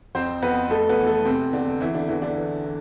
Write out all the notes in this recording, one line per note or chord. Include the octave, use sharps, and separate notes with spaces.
F2 C4 C5
F2 B3 B4
F2 A3 A4
B3 B4
E3
A3 A4
E2 C3 C4
E2 D3 D4
E2 E3 E4
D3 D4
E2 E3 E4
D3 D4
E3
E3